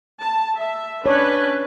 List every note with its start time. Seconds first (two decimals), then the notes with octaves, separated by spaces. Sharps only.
0.21 A5
0.57 E5
1.06 C#4 D4 B4 C#5